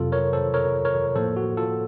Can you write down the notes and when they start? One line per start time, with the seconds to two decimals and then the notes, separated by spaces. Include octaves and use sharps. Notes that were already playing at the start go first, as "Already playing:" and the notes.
Already playing: F2 C3 F#3 F4 A4
0.12 A#4 C#5
0.33 A4 C5
0.54 A#4 C#5
0.85 A#4 C#5
1.16 A2 F3 A#3 A4 C5
1.36 F#4
1.57 F4 A4